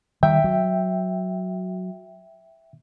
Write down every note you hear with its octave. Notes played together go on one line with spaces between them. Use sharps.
D#3 G3 E5 G5
F#3